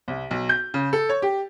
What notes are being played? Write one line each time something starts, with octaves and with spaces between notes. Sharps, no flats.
C2
B1
G6
C#3
A4
C#5
G4